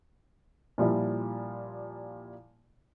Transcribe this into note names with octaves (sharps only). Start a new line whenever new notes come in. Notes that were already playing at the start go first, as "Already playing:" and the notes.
A#2 F3 G3 E4 D5